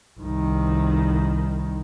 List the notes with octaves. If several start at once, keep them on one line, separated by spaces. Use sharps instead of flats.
C2 D#3